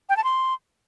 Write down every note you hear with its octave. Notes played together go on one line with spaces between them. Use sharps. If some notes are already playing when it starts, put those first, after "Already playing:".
G5
A5
C6